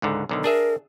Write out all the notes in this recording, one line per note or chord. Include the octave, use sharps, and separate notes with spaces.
C#2 G#2 D3
B1 D3 D#3
D4 G#4 A#4 E5